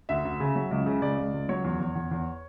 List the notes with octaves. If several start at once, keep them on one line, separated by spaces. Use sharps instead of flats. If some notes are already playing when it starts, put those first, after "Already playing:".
D2 E5
D2
C#3
F#3
C#2
C#3
C#2 D5
C#2
C#2
F#3 C#5
E2
E2
E2
E2